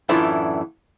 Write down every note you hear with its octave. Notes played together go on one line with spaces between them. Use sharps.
F#2 A2 E3 D4 E4 F4